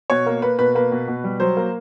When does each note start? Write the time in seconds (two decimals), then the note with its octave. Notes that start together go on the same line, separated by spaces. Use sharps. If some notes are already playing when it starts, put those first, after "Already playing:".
0.10 B2 C#5
0.26 A#3
0.42 A#3 B4
0.59 B2 B4
0.75 A#3 B4
0.92 B2
1.08 B2
1.24 G3
1.40 F#3 C5
1.57 A#3